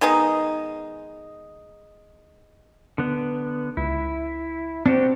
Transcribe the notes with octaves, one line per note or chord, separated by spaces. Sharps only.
D#3 G#3 B3 D#4
D3 B3
C#2 E4
C4 D4 F#4 G4